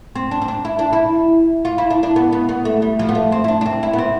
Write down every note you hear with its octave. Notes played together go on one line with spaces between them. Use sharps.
C4
D4
C4
D4
E4
D4
E4
F4
E4
D4
D4
B3
B3
B3
A3
G3
F3
B3
A3
C4
E4
D4
D4
C4
E4
B3
C4